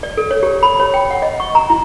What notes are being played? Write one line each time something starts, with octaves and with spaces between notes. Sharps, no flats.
D5
A4
C#5
G4
B5
C#5
G5
F#5
D#5
C#6
A#5
E4